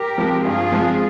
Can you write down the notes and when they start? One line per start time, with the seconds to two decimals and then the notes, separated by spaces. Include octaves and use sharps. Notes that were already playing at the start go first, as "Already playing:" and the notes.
Already playing: G4 A#4
0.18 F3 G#3 C4
0.45 G2 F4 G#4
0.72 F3 G#3 C4